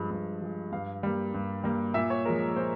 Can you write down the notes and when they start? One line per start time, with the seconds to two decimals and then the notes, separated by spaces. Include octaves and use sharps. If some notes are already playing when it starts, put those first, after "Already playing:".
Already playing: G2 F3 G#3
0.11 G2
0.41 F3 G#3
0.72 G2 F5
1.03 G3 A#3
1.34 G2
1.64 G3 A#3
1.94 A#2 E5
2.10 C#5
2.25 F3 G#3 A#4
2.56 A#2 C5